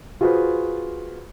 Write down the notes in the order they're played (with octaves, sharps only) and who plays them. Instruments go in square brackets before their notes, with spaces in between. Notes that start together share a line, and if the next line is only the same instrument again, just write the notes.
[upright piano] F4 F#4 G#4 B4 C5